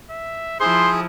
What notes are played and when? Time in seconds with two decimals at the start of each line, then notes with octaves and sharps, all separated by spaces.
0.10 E5
0.60 F3 E4 G#4 C5 C6